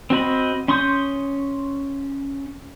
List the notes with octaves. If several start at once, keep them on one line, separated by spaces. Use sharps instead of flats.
C4 F#4 D#5 B5
C#4 C6 C#6 D#6 G6